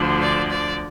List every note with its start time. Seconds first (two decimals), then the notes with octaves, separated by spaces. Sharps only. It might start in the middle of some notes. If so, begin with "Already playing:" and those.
Already playing: D2 D3 F3
0.21 D5
0.50 D5